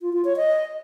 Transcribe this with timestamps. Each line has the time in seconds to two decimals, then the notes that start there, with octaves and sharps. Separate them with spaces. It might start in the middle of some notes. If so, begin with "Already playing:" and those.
0.01 F4
0.13 F4
0.25 C#5
0.36 D#5